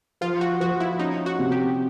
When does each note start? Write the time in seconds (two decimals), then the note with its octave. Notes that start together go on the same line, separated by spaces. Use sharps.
0.21 F3 F4
0.41 F#4
0.60 F3 F#4
0.80 E4
0.99 C#4 D#4
1.26 F#4
1.39 C3
1.52 G4